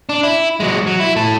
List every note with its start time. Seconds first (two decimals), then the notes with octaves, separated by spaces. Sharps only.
0.09 D4
0.23 E4
0.60 F#3 G#3
0.87 F#3
1.00 E4
1.16 A2 A4